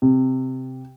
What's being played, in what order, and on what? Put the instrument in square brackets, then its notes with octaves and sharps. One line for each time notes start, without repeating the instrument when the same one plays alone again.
[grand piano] C3